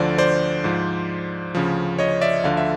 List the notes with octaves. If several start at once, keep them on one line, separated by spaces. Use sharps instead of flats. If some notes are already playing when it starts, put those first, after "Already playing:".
Already playing: D2 D3 F3 C5 D5
C5 D5
G#2 F3
D2 C#3 F3
C#5 D#5
D5 E5
D2 D3 F3 F5
E5